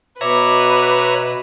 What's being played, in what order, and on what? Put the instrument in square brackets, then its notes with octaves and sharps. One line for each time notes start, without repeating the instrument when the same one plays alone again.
[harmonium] B2 [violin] B4 [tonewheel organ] C#5 E5 A#5 [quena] D6